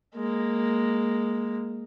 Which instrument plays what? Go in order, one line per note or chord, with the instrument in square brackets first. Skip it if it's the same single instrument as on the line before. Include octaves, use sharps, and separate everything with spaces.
[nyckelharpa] G#3 A#3